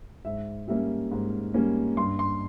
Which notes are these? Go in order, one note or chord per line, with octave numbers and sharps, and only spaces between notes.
G#2 E5
G3 A#3 C#4 E5
G#2
G3 A#3 C#4
G2 C6
C6